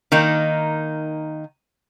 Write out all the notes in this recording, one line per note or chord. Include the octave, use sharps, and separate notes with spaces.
D#3 A#3 D#4